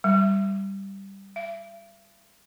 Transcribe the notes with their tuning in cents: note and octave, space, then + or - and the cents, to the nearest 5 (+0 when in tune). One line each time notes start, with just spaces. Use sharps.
G3 +0
E5 +45